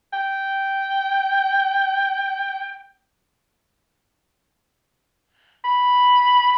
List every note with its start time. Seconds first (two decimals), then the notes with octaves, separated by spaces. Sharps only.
0.13 G5
5.64 B5